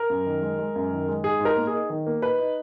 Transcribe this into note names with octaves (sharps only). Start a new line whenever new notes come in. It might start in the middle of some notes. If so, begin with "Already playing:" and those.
Already playing: A#4
F#2
D#3
G#3
G#3
F#2
D#3
G#3
G#2 G#4
G#2
A#4
A#3
G#4
D#4
D#3
A#3
D#4 B4
D#4